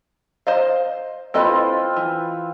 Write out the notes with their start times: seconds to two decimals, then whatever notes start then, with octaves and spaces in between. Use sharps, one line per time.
0.47 C5 D#5 F5
1.34 C4 E4 F4 A4 B4 D#5
1.96 E3